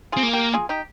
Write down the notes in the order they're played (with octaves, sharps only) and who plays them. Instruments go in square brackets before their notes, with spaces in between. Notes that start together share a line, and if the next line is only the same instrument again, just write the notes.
[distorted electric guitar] C4 [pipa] F4 G#4
[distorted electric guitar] A#3
[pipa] G4 A#4
F4 G#4
D#4 G4